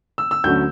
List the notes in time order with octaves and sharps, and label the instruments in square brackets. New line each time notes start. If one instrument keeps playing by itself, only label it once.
[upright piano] E6
E6
D2 D3 F#3 A3 C#4 G6